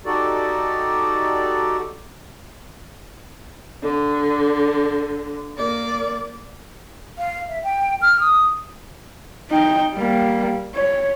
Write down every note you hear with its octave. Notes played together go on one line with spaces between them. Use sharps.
D#4 F#4 G4 A4 D5
D3
A#3 D5
F5
E5
G5
F6
D#6
D#4 G5
G3 A#3
C#5